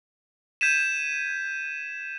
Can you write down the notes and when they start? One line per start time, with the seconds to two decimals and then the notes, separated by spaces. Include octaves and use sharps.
0.61 G6 G#6 B6 D#7 E7